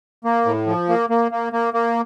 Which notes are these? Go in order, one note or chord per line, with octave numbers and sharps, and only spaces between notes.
A#3
A2
F3
A#3
A#3
A#3
A#3
A#3